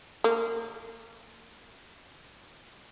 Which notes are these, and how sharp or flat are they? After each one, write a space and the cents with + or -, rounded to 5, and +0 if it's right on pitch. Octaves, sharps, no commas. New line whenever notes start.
A#3 -30